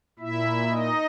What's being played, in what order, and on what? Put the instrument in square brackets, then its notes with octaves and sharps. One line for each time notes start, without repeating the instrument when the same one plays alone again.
[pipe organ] A#2 E4 E5
D#4 D#5